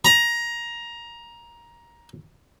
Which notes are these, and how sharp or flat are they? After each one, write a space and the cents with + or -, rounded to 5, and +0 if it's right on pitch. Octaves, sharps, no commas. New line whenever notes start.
A#5 +15